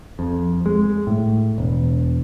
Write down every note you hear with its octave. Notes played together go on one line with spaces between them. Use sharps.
F2
G#3
A2
E1